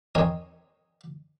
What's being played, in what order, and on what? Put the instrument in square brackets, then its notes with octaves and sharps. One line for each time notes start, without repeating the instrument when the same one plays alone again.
[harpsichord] C4 D#4 A#4 C#5 D#5 G#5